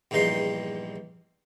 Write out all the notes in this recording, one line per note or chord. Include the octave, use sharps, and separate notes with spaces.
A#1 E2 G2 D#4 G5 C6